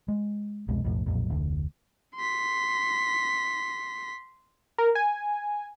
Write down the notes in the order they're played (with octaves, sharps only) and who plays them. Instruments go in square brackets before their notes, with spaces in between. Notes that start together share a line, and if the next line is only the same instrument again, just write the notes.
[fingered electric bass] G#3
C2 F2 B2 G#3
B1 F2 A2 F3
B1 F2 A#2 F#3
F1 D2
[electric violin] C6 B6
[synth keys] A#4
G#5